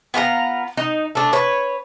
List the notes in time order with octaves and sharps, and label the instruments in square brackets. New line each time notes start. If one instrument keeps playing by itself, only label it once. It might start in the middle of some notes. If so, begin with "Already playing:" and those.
[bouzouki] B3 F4 G4 A#5
D#4
A3 D4
B4 C#5